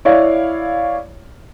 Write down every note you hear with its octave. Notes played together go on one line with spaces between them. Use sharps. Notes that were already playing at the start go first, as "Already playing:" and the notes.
E4 C#5 D5 F5